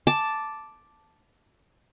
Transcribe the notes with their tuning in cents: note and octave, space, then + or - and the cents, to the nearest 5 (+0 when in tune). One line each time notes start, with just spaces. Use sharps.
A5 +0 D6 +0